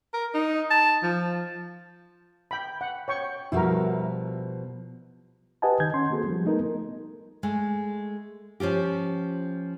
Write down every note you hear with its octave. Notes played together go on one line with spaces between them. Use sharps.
A#4
D#4
A5
F3
G5 B5
F#5
C#5 G5 C#6
B2 F3 G3 E4 F#4 A#4
G4 B4 D#5 F#5 G#5 A5
D#3 G6 G#6
C#4 C6
A#3 C4 F#4 G#4 A4
F3 G3
A3 B3 D#4 A4 A#4
G#3 A3
F3 C#4 F4 G4